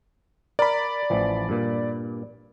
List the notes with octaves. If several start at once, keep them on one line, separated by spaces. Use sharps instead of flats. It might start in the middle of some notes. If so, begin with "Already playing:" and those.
A#4 D5 B5
A1 E3 F3
G2 A#2